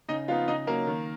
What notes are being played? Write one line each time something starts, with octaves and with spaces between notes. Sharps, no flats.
C#3 D#4 D#5
F3 B3 D#4 F4 F5
C#3 D#4 D#5
F#3 A#3 C#4 A#4
D#3